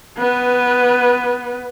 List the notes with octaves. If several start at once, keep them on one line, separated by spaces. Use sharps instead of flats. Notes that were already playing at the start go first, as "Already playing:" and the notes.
B3 B4